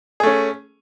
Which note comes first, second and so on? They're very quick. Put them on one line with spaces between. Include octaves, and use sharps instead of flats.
G#4 A3 C#4